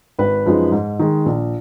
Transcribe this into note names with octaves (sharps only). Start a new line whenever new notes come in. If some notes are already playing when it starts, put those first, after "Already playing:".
G#1 B4
F#2 F3 G#3 D#4
G#2
D#3 G#3
A#1